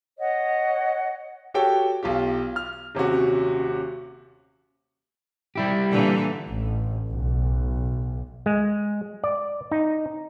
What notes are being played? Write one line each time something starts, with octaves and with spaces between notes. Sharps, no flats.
C#5 D#5 F#5
F#4 G4 A4 C#5 G5
B1 F4 G4
F6
D#1 C3 C#4 F#4
G3 E4 G4
A#2 D3 E3
A1
B1
G#3
D5
D#4